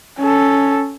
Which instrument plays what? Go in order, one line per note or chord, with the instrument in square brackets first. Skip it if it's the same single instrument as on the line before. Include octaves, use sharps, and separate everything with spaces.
[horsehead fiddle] C#4 A4